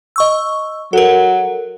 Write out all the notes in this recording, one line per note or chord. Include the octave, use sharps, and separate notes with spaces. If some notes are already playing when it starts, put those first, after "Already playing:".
D#5 C#6 E6
F#3 A4 A#4